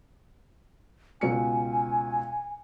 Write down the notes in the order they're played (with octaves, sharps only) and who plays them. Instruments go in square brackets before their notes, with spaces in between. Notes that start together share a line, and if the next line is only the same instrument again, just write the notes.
[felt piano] C#2 B2 C#7 [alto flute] G#5